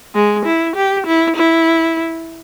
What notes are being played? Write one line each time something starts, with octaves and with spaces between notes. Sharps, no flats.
G#3
E4
G4
E4
E4